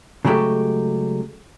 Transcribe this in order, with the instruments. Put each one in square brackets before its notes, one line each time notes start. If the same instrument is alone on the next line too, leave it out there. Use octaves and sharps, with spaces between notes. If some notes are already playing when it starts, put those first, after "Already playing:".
[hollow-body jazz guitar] C#3 F#3 G#3 A3 G4